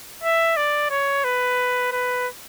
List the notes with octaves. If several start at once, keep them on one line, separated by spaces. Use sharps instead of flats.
E5
D5
C#5
B4
B4